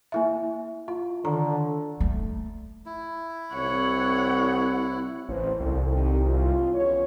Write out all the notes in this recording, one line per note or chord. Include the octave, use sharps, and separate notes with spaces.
A#3 E4 E5
F4
D3 D#3 A#5
A3
E4
C2 C#5 F#5
A1 C5
C2 A#2 A4
D#3 D#4 G4
D#2 G#2 F4
E2 C#4 C#5